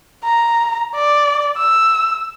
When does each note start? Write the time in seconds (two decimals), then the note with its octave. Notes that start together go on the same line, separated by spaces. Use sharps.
0.24 A#5
0.95 D5
1.58 E6